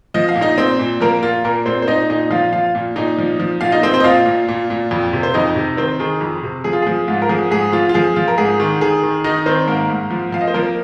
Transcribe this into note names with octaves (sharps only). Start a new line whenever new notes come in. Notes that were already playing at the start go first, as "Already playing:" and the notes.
F3 D#5
F5
A#2
D#4 D#5
A#2 C4 C5
A#2
F3 A#3 A#4
A#2 F4
A#2 A#3 A#4
A#2 C4 C5
C5
A#2 D#4 D#5
A#2 D#4 D#5
F3 F4 F5
F3 F4 F5
A#2
A#2 D#4 D#5
F3
F3
A#2 F4 F5
D#4 D#5
A#2 C4 C5
C4 C5
D#5
A#2 F4 F5
A#2
A#2
A#2
F2
C3
C5
F2 D#4 D#5
C3
D#3 C4 C5
D#3 G#4
F2
C3
F3 G#4
F4
F3 G#4
G#2 F4
A#4
F3 G#4
G#2 G#4
F3 F4
F4
F3 G#4
F3 F4
A#4
G#2 G#4
D#3
D#3 G#4
D#3
D#3 D#4 D#5
D#3 C4 C5
G#2 A#3 A#4
G#2
F3
F3 F5
D#5
C5
F3 A#3 A#4